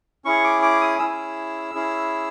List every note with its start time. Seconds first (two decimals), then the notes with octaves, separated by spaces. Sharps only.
0.25 C#4 E4 G#4 C#6
0.44 D6
0.62 D6
0.81 D#6
0.99 C#4 E4 G#4 E6
1.75 C#4 E4 G#4